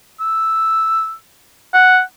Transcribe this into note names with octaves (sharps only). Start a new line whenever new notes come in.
E6
F#5